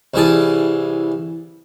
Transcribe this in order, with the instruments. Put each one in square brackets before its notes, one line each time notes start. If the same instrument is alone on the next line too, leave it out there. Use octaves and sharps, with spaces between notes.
[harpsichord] C2 E3 G#4 A5